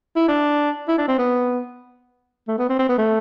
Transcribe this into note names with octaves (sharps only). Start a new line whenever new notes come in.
E4
D4
E4
D4
C4
B3
A3
B3
C4
C4
B3
A3